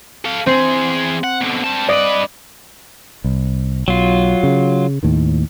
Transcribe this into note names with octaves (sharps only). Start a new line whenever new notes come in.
A4 F5
E2 C4 G#4
F#5
B2 D3
G3 A5
G2 B4 D5 D#5
C2
B1 F#3 F4
C#3
D#2 A2 D#3